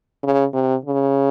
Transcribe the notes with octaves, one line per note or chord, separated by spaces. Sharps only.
C#3
C3
C#3